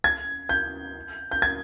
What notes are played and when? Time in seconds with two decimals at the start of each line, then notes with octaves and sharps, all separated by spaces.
0.04 G#6
0.49 G6
1.31 G6
1.42 G#6